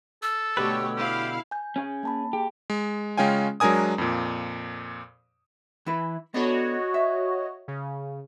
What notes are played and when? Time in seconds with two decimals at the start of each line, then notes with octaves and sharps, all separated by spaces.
0.23 A4 E6
0.57 B2 D3 A3 G4 B4 C#5
0.97 E4 G4 F5
1.51 G#5 G6
1.76 C#4 G#4
2.03 A#3 A5 B5
2.33 G4 G#4
2.70 G#3
3.17 C#3 G#3 C#4 F4 G5 G#5
3.60 F#3 G#3 D4 A#4 G#5 D#6
3.98 F2 A#2
5.86 E3 E4 B4
6.34 B3 D4 F#4 A4 C#5 D#5
6.94 E5
7.68 C#3